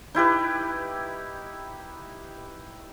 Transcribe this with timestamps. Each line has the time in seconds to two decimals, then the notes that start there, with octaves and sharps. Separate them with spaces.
0.15 D#4 E4 G4 B4